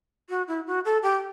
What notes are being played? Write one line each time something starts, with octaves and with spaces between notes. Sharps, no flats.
F#4
E4
F#4
A4
G4